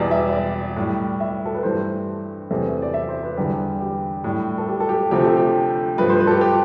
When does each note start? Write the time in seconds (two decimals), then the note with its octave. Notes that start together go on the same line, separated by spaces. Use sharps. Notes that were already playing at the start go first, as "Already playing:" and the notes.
Already playing: E2 B2 G3 D5
0.11 E5
0.33 D5
0.76 A2 G3
1.20 E5
1.45 A4
1.54 B4
1.63 G2 E3 A3 C5
2.50 E2 C3 E3 A3
2.82 D5
2.94 E5
3.09 C5
3.23 B4
3.37 E2 D3 G3
3.80 G4
4.24 A2 G3
4.58 A4
4.67 G4
4.80 A4
4.89 G4
5.11 D2 C3 F3 A3 G4
5.24 A4
5.37 G4
5.98 G2 F3 A3 B4
6.10 C5
6.20 B4
6.27 A4
6.31 G4
6.41 G4